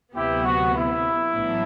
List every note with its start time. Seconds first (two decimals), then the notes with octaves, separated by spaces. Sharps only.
0.14 D2 C3 F#3 B3 E4 G4
0.44 F#4
0.75 E4
1.34 A1 A2 F#3 B3 D4